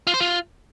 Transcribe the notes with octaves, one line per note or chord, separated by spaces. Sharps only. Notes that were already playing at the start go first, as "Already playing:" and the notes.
F4
C5
F4